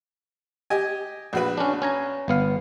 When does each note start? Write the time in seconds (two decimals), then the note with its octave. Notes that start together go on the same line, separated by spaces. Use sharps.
0.70 G4 D#5 G#5
1.33 A#1 F#4 B4
1.58 C#4 D4
1.82 C#4 G#5 A#5
2.28 G1 B3 F5